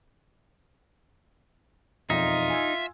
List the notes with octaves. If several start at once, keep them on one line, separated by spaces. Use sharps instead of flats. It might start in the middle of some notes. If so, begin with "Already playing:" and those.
E1 F2 D#4 F4 E5
G#5 E6 G#6